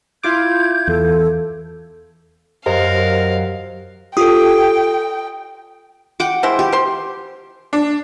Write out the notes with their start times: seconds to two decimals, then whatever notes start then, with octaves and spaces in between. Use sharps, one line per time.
0.23 E4 F4 D6 G6 G#6
0.88 E2 A4
2.66 F#2 G4 A#4 C5 D#5 F5
4.17 F4 G4 A4 G5 D#6
6.20 F#5 G5 D6
6.43 G#3 E4 C5
6.59 G4
6.72 C5 C6
7.73 D4